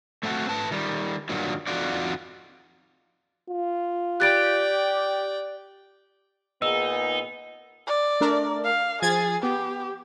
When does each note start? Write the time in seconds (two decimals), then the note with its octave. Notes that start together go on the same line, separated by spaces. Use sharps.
0.23 A3 C4 E4 F#4
0.49 A2 B4 A5
0.71 D#3 G3
1.29 G2 A#2 D#3 F#3
1.67 F2 D#3 D#4 F4 F#4 D5
3.50 F4
4.20 G4 D5 G5 F#6 A6 D7
6.62 A#2 B3 D#4 G#4 D#5 E6
7.87 D5
8.21 A3 D4 A#4
8.65 F5
9.02 F3 G#4 G#6 A6
9.43 B3 G4